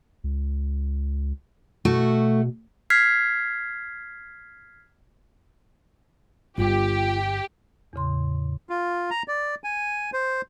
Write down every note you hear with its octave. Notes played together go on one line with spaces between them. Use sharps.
C#2
B2 A3 F#4
F6 G#6 B6 C7
G1 G2 F4 G4
E2 A2 C#3 C6
F4
A#5
D5
G#5
C5